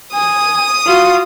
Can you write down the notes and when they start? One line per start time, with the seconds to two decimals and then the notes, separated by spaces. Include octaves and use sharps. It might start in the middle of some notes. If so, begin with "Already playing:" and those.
0.13 G#5 D#6
0.85 F4 F#4